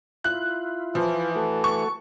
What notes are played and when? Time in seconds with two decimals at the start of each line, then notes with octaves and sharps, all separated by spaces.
0.24 E4 F4 F#6
0.95 E3 F3
1.36 A3 F#4 A4
1.64 C#6